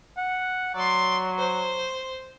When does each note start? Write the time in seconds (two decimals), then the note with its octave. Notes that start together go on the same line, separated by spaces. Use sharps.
0.17 F#5
0.75 F#3 D5 C6
1.38 C5